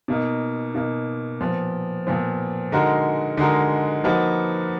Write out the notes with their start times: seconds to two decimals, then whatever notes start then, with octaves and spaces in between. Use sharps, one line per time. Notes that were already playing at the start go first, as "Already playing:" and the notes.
0.08 B2 A#3 D#4
0.75 B2 A#3 D#4
1.41 A#2 F3 B3
2.07 A#2 F3 B3
2.72 D3 G#3 D#4 F#4 A#4
3.37 D3 G#3 D#4 F#4 A#4
4.04 F3 A#3 D#4 F#4 B4